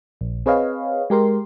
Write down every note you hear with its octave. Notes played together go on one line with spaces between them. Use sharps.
A#1
C4 G#4 B4 C#5 D#5 F5
G#3 G4 A#4 C6